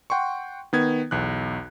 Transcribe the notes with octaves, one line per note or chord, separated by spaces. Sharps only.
F#5 G5 C6 C#6
D#3 B3 G#6
B1 E2 F#6